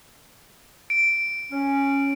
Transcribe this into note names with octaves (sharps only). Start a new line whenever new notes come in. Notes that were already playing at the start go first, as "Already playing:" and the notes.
D7
C#4